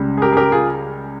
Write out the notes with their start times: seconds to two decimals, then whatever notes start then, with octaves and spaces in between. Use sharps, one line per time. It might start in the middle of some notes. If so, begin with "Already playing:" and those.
Already playing: C#2 C#3 G3
0.17 G#4
0.22 G4 A#4
0.32 G#4
0.37 G4 A#4
0.52 F4 G#4